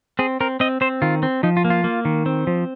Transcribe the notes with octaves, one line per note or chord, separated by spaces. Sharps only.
C4 G#4
C4 A#4
C4 D#5
C4 C5
D#3 F4
C4
F3 D#4
F4
A#3
F4
A#3
D#3
C4
F3